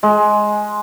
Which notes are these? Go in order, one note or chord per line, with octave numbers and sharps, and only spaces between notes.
G#3